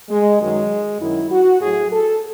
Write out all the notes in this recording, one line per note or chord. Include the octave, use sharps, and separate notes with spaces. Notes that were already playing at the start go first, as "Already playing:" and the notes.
G#3
F#2 D#3 F#3 G#3
F#2 D#3 F#3 E4
F#4
A2 F#3 G#4
A4